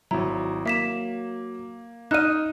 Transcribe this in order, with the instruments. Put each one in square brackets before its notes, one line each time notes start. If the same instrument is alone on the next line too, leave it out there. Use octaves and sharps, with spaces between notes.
[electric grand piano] G#1 E4 [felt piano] F#3 [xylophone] A#5
[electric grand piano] A#3 [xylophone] E5 B6 E7
[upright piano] D#4 [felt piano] D#5 F6 E7 [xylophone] F#6 D#7